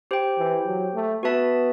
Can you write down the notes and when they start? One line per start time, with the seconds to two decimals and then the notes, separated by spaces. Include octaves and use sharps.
0.11 G4 C5 G5
0.39 E3
0.67 F#3
0.95 A3
1.23 B3 F#4 B4 E5 A5